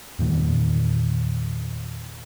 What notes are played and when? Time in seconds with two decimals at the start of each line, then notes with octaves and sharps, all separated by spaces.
0.19 E2 A#2 D#3 G3